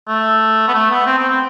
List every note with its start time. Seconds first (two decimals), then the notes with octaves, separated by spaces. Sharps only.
0.08 A3
0.68 B3
0.74 A3
0.91 B3
1.06 C4
1.18 C4
1.29 C4